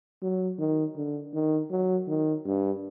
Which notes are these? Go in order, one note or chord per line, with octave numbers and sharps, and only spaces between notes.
F#3
D#3
D3
D#3
F#3
D#3
G2